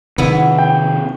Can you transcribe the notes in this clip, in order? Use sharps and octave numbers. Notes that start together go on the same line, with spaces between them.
C3 D#3 B3 E4
G5